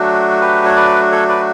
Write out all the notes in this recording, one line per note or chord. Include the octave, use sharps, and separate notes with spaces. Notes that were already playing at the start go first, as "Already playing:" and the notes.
Already playing: F#3 A3 D4 F#4
G4 B4
C#5
B4 D5
A4 C#5
B4 D5